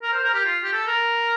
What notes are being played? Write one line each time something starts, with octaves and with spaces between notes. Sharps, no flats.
A#4
C5
A#4
G4
F4
G4
A4
A#4